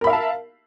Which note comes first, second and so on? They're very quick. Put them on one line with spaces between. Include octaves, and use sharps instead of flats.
A#4 B5 E5 F5 A5